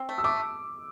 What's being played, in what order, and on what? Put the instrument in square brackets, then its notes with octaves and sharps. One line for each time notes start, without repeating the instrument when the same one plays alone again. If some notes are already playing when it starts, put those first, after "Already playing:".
Already playing: [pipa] C4
A3
[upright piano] E6
[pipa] A3 [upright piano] D6